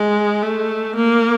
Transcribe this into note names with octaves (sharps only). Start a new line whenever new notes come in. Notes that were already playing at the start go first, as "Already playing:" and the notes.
Already playing: G#3
A3
A#3